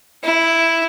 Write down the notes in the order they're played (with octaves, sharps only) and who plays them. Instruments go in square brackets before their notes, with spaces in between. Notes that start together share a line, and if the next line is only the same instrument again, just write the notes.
[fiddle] E4